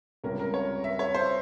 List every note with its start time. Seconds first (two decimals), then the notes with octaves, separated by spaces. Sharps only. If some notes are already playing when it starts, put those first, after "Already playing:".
0.24 C#2 C3 G3 C#4 A#4
0.39 A#4
0.54 C#5
0.84 E5
0.99 C#5
1.15 C5